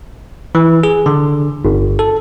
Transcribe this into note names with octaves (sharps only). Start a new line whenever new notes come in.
E3
G#4
D3
G1
A4